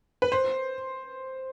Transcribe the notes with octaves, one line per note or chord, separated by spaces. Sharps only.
B4
C5